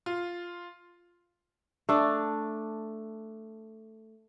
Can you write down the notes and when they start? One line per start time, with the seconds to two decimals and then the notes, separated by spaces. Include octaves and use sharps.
0.06 F4
1.89 A3 D4 D5